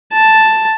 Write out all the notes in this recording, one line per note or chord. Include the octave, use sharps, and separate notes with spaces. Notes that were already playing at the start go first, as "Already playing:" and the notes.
A5